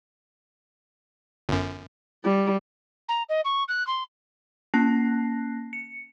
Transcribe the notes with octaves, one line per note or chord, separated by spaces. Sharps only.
G1 F#2
G3
A#5
D#5
C#6
F#6
C6
A#3 C#4 A5 F#6 A#6 C7
C#7